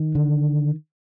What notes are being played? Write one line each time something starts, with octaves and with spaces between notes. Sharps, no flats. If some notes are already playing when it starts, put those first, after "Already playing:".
Already playing: D#3
D3